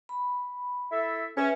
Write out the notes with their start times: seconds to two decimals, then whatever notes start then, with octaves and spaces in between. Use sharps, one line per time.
0.09 B5
0.91 E4 A4 E5
1.37 C#4 B4 E5